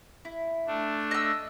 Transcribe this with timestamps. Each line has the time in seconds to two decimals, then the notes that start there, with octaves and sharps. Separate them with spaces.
0.25 E4
0.67 A3 D4
1.11 D#5 E6